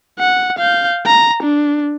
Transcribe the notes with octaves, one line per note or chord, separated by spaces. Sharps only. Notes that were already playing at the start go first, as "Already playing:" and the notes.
F#5
F5 G6
A#5
D4